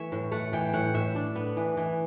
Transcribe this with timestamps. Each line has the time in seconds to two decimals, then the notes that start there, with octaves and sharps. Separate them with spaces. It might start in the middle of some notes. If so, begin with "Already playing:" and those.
Already playing: E3 A3 C#5 E5
0.12 A2
0.32 A3 F#5
0.53 E3 G5
0.74 A2 F#5
0.94 A2 E5
1.15 D4
1.36 B3
1.57 E3
1.77 E3